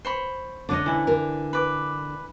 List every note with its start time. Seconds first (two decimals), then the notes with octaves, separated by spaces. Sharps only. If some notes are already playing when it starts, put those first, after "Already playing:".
0.05 C5 C#5 B5
0.69 D3 A3 C#4 D4 D#5
0.86 E3 E4
1.07 D3 A#4
1.53 B4 D6